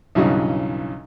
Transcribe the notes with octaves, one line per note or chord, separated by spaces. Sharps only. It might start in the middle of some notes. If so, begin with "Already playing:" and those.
B1 G2 C#3 E3 F#3 D#5